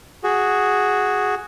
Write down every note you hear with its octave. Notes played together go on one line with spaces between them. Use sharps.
F#4 G#4